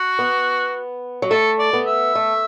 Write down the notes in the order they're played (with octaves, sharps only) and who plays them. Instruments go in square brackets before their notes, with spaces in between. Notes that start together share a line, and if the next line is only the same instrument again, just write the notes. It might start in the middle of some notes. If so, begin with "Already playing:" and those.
Already playing: [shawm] F#4
[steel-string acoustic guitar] B3
F#3
[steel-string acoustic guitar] A3 [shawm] A4
[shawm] D5
[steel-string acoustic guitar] B3
[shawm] E5
[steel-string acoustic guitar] A3